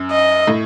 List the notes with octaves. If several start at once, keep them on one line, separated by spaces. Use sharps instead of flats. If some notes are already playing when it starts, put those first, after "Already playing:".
Already playing: F#2
D#5
A2